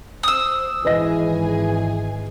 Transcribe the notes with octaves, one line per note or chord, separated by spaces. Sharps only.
C5 D#6 E6
G#1 E3 G#4 B4 D#5 G#5 A#6